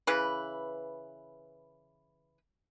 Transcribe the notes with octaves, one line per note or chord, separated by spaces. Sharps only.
C#3 E3 B4